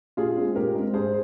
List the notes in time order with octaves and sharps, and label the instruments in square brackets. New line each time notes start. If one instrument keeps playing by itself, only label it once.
[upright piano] A#2 F4 G#4
G#3 C4
A#2 G4 A#4
G#3 C4
G#2 G#4 C5